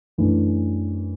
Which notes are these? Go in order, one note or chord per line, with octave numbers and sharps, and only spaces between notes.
F#2 E3 A3 D4